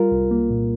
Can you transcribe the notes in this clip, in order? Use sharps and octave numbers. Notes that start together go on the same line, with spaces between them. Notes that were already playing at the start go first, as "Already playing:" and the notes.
Already playing: G3 F4 A#4
C2
A#3
A#2